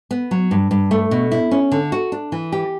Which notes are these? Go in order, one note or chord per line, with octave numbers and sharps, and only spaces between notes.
B3
F#3
G2
G2
A3
B2
E4
C#4
D3
F#4
D4
E3
G4